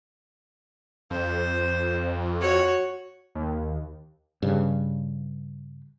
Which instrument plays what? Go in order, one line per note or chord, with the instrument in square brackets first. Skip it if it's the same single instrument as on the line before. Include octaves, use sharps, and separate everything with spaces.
[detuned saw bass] F2 [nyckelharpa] C5
[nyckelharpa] F#4 C#5
[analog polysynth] D#2
[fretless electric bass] G2 C#3